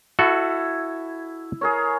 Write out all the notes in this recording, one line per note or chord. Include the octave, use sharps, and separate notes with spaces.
E4 F#4 A4
G#4 A#4 C#5